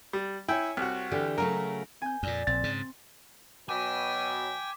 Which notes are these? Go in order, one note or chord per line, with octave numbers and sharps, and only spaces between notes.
G3
E4 C#5 G5 G#5
C2 F#4
D3 E3 G4
C#3 F#3 A3 A#4
C4 G#5 G6
F2 A#2 D5
A#1 C4 A6
G#2 C#3
B2 F#3 G5 G#5 D6 B6